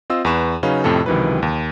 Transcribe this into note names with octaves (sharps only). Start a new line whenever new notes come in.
C4 F4 D#5 E6
E2 B4 C#6 E7
C#3 F#3 C#4 D#4 B4 F5
F2 A2 C3 A4
C#2 C3 D#3 E3 F#3 B4
D#2